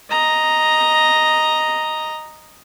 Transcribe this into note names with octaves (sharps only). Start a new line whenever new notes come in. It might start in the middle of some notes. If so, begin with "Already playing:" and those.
D#5 A#5